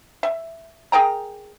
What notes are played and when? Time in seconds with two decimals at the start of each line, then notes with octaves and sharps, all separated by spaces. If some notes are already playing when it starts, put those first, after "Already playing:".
0.23 E5
0.92 G#4 A#4 G5 A#5